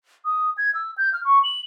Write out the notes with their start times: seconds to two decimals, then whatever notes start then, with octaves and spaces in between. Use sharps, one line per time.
0.25 D#6
0.58 G#6
0.74 E6
0.98 G6
1.13 F6
1.25 C#6
1.44 F#7